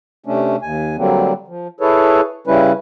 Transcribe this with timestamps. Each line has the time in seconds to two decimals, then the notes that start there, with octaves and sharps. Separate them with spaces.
0.26 C3 A3 C#4 D4
0.62 D#2 G#5
0.97 D3 F#3 G3 A#3 C4
1.47 F3
1.81 E4 G#4 A4 B4 C#5
2.47 C#3 G3 C#4 E4 B4